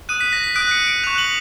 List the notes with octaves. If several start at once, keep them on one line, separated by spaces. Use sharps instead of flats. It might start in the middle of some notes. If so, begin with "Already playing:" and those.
D#6 F#6 D#7
B6
A#6
B6
D#6 F#6 D7
C#7
D7
C#6 F#6 F7
F#7